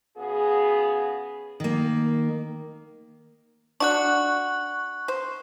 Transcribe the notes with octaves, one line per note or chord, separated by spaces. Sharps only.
C#3 B3 F#4 G#4
D#3 A#3
D4 F#4 C#6 F#6
C5